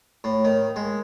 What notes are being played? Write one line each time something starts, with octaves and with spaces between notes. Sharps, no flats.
A2
D#3
G#3